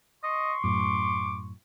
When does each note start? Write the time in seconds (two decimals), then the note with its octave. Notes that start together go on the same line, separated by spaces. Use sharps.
0.24 D#5 C6 C#6
0.64 F#2 A2 D6